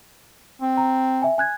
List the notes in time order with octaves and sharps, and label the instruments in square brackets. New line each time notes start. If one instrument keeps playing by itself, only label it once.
[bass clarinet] C4
[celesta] A#5
E5 G#5
G#5 F#6 G#6